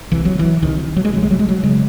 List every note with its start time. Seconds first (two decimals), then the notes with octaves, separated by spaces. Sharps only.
0.12 C2 C3 E3
0.25 F#3
0.39 E3
0.62 C2 C3 D#3
0.96 F#3
1.05 G#3
1.13 C3 F#3
1.17 C2
1.23 G#3
1.31 F#3
1.39 G#3
1.49 F#3
1.63 C#3 G#3